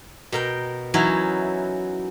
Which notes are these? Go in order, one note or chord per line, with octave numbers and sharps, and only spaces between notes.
B2 A#4 G5
E3 F#3 C#4 D#4 E4